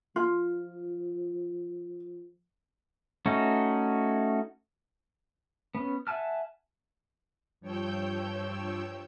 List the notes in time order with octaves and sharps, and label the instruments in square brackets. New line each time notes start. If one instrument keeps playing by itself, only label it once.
[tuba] F3 [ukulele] F4
[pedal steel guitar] A3 C#4 D#4 F#4
B3 C#4
E5 F#5 G#5 A5 F6
[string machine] G2 F3 C#5 G5 E6 G6